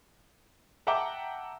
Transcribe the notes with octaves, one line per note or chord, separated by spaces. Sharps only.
E5 F#5 G5 A5 A#5 D6